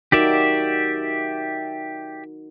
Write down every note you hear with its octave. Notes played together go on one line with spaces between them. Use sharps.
D#4 F#4 G4 A#4 D5 E5